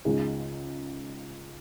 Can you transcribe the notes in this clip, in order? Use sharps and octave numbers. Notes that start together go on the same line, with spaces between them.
C#2 C#3 G#3 D#4 G#4